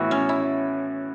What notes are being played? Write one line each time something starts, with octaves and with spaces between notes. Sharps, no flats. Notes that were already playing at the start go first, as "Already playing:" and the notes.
Already playing: A2 E3 B3 E4 F#4
C#4
E4